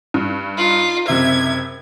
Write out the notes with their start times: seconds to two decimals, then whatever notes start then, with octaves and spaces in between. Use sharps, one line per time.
0.14 G2
0.58 D#4 F4
1.08 F#1 C3 E5 G#6